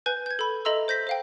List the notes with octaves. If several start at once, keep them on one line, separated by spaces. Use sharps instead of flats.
B4 G#5 G6
G6 G#6
A4 B5
A4 D#5 E5 A#5 C6 E6
C5 G6 A#6 B6
C5 F5 G5